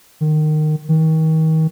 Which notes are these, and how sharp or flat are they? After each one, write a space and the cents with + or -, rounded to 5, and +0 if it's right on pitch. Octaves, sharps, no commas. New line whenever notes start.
D#3 -20
D#3 +35